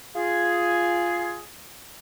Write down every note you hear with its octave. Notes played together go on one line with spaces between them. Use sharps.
F4 G#4